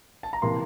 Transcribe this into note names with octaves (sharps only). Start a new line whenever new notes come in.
A5
A#5
C3 E3 A#3 C6